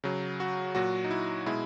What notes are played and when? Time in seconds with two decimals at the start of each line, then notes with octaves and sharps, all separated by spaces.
0.04 C#3 F#3
0.40 F#4
0.75 A#2 F#3 F#4
1.04 D#4
1.11 E4
1.46 B2 G#3 E4